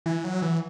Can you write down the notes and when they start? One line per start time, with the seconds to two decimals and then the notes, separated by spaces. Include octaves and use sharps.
0.06 E3
0.24 F#3
0.42 E3